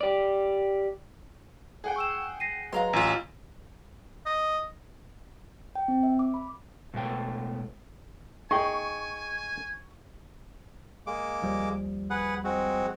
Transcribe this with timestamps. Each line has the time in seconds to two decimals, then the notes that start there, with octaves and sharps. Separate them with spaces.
0.01 G4 D5
1.84 G#4 F#5 G5
1.96 C#6 E6 E7
2.40 A#6 C7 D#7
2.73 F#3 G#3 B4 F5 A#5 C6
2.93 A1 F4 G#5 E6
4.26 D#5
5.75 G5
5.88 C4
6.03 E5
6.19 D6
6.34 B5
6.94 B2 G#3 A3 B3 G5
8.51 D#4 G#4 G5 G#5 C#6
11.07 G#3 A#3 D6
11.42 D#2 F3 G3
12.10 G#4 B4 F#5
12.44 G#3 C4 F#4